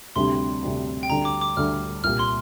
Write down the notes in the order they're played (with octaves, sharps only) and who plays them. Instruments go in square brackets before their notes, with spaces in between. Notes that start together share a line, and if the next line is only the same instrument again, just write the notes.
[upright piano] D2 C3 G3 D4 G4 [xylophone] C6
[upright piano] D2 C3 G3 D4 G4
[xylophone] G5
[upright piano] D2 D3 G3 [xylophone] A#5
[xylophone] D6
D6
[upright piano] D2 D3 G3 [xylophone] F6
[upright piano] C2 A#2 A#3 G4 [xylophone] F6
[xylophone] C6